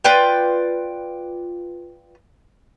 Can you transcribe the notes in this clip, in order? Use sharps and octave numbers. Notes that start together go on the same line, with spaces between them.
F4 B4 D5 G5